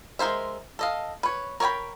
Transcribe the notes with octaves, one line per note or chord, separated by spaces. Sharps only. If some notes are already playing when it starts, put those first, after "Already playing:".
G#3 F#4 A#4 C5 E5
A4 D#5 F5
B4 C#5
A#4 C#5 D5 G5 B5